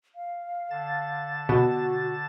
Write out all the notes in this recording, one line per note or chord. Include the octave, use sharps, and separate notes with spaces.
F5
D3 A5 A6
B2 F#4